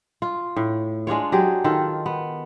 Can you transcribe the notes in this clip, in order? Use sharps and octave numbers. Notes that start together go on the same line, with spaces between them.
F4
A2
G#3 D4 F4 C#5
F#3 G4 G#4
D#3 F4 A4
B3